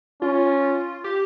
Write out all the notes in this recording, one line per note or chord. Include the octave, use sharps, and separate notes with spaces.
C#4 F4
G4